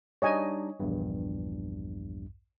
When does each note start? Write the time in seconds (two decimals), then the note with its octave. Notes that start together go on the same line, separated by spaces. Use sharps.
0.22 G3 D4 D#4 C#5 D#5 G#5
0.80 A#1 E2 G2